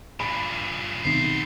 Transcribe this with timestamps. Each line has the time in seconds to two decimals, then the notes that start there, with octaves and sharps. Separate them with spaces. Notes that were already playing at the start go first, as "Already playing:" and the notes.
0.20 G2 A#2 B5
1.05 B1 C3 D#3 B3 C5